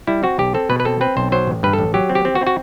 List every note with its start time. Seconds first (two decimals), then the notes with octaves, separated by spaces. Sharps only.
0.07 G3 E4
0.23 C4 F#4
0.39 B1 G4
0.54 C4 A4
0.70 B2 B4
0.80 B4
0.85 C4 A4
1.01 C4 B4
1.17 B1 C5
1.32 F#3 C5
1.47 A1
1.63 G2 B4
1.73 A4
1.78 A1
1.94 F#3 G4
2.09 C4
2.15 G4
2.25 C4
2.35 F#4
2.41 C4
2.47 F#4